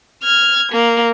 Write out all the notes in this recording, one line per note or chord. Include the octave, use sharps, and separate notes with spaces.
F6 G#6
A#3